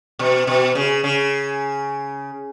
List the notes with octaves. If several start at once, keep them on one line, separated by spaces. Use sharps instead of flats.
B2
B2
C#3
C#3